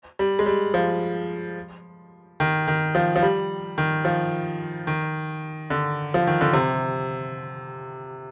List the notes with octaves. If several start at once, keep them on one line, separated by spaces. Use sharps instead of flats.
G3
G#3
G3
F3
D#3
D#3
F3
F3
G3
D#3
F3
D#3
D3
F3
D#3
D3
C3